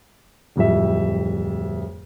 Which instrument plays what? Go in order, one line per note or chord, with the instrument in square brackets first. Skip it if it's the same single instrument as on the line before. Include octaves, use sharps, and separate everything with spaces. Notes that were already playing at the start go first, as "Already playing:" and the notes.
[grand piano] D1 F2 G3 E5